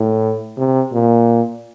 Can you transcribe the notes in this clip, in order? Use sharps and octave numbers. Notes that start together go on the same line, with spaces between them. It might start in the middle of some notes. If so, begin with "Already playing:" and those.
Already playing: A2
C3
A#2